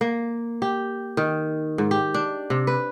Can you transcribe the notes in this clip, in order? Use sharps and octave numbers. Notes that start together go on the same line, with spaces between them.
A#3
G4
D#3
G#2
G4
D4
C3
B4